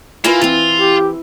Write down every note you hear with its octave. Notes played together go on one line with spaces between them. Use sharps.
A#3 E4 F4 B4 G#5 A#5
E3 C4 F4
G4